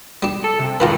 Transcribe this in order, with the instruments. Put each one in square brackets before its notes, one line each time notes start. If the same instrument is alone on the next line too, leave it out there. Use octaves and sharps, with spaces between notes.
[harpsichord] G3 D4
[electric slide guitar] A4
C3
[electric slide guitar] G#2 B4 [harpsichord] D#3 F4 A#4